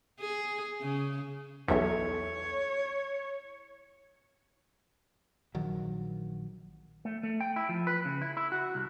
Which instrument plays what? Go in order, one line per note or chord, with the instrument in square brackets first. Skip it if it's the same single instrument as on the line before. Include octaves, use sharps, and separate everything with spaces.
[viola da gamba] G#4
C#3
[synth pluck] B1 E2 [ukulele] E4 A4 E5 [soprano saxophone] C#5
[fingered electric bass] A#1 D#3 F#3
[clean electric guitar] A3
A3
G5
E4
F3
B4
C#3
E4
E4
F#4
C2